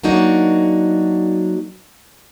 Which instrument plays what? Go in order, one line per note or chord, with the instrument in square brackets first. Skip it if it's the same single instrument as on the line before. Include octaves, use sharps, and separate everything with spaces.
[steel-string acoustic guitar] F#3 A#3 D4 D#4 F#4